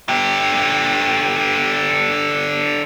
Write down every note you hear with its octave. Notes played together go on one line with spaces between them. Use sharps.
D3 G4